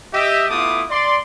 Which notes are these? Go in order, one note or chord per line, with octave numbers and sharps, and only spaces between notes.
G4 D#5 E5
A3 B3 E4 F4 D6 D#6
D5 C6